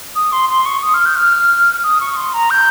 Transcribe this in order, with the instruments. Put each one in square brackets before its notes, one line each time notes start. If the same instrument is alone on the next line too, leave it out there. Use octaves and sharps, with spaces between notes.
[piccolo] D#6
C6
C6
C#6
D#6
F6
G6
F6
D#6
C#6
C6
A#5
G6